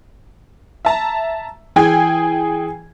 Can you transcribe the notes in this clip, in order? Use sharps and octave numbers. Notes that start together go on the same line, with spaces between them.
E5 A5 A#5
E3 G#4 G5 G#5 G#6